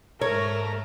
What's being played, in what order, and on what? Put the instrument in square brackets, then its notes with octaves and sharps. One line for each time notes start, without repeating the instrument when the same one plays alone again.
[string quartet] G#2 A3 [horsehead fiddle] A#4 [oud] C#5 [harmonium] A#5